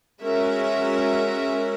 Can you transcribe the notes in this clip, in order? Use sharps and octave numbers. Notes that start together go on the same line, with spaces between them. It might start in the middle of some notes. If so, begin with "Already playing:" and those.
G#3 C#4 F#4 A#4 E5